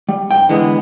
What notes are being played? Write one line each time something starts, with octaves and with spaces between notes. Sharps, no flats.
G3
G2 G5
D3 E3 G#3 B3